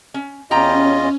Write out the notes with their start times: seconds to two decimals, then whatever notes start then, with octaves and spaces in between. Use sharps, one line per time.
0.14 C#4
0.51 E2 C#4 F4 G4 D#5 G5 A#5